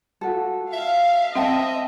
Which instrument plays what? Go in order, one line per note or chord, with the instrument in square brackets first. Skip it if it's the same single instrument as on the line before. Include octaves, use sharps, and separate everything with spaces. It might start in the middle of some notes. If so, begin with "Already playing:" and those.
[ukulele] F4 F#4 A4
[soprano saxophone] E5 [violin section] F5
[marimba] C4 [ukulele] C5 G5 A5 [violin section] D#5 [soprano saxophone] E5